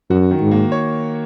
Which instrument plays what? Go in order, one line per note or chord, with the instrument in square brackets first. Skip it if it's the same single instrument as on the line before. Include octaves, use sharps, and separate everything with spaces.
[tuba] F#2 [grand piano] F#4
[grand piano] D#3
[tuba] G#2
[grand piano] A#3
C#5